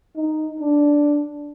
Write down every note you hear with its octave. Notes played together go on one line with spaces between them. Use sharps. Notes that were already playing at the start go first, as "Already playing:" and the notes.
D#4
D4